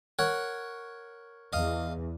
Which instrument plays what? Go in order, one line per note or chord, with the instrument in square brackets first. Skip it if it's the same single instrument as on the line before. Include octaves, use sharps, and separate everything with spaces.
[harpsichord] A#4 C#5 F#5
[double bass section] E2 [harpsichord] D#5 F5